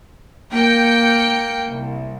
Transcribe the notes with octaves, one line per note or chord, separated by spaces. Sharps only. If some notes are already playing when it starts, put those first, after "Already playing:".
A#3 G5 G6 C#7
C2